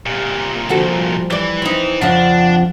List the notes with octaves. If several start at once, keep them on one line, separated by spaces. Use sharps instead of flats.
C2 A#2 G4
D3 F3 F#4 A4
G3
E3 B4 D5
C4 D#4
F2 C#3 F3 D4 F#5